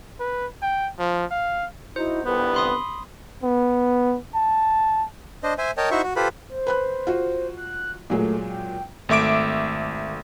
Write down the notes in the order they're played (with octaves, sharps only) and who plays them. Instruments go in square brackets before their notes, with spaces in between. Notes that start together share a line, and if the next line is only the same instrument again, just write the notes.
[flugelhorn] B4
G5
F3
F5
[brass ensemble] D#4 F#4 [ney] E4 [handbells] C5
[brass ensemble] G1 C2 [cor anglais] B3 [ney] B4
[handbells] B5 C6 D#6
[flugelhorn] B3
A5
[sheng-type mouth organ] D4 C5 D#5
C5 E5 G#5
A#4 C#5 D#5 G5 A5
D#4 E4 F#4 C5 E5 C#6
F#4
F4 G4 A4 B4 C5 B5
[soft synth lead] C5
[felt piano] B4 B5 F#6
F4 F#4
[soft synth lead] F#6
[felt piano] A#2 F#3 G#3 [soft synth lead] A3
[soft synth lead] G5
[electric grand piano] G#1 A3 E5 D6 D7